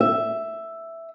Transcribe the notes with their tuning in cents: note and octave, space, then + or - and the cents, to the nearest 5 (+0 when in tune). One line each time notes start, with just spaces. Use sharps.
E5 +5